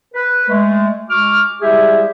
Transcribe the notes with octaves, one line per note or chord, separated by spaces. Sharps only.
B4
G#3 A3
G#3 F#4 D6 F6
G3 G#3 E4 G4 G#4 E5